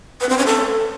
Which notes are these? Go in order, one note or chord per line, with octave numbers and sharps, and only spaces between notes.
B4
C4
C#4
A4